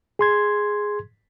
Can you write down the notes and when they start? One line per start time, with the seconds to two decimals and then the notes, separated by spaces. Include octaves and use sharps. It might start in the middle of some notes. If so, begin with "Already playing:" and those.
0.19 G#4 C6 G#6